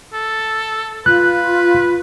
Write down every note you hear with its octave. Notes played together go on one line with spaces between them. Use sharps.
A4
F4 B4 F#6